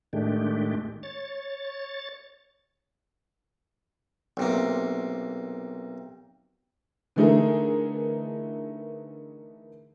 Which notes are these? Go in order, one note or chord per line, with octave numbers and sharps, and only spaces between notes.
A2 D#3 G#3 A3 D4 G4
C#5 A6
B1 C3 A#3
D3 E3 A3 D#4 G#4 A#4